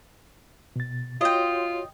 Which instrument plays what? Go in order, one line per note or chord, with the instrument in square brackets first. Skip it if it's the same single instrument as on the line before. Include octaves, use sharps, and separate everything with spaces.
[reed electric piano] B2 A6
[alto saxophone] F4 [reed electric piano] F#4 C#5 C6 [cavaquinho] D#5 G5